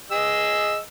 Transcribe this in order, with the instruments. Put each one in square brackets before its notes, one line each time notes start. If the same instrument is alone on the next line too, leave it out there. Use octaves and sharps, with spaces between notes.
[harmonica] G#4 D#5 E6